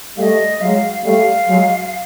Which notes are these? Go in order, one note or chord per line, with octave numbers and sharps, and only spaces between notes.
G3 A3 D#5 F5
F#3 G#3 F5
G3 A3 F5
F#3 G#3